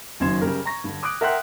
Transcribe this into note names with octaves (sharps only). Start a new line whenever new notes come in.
F#1 F#2 D#3 C6 G#6 E7
C#3 G3 A#4
A#5 C#6 A#6
G2 D3
D6 D#6 F#6 D7
A#4 E5 F#5 G5 C6 F#6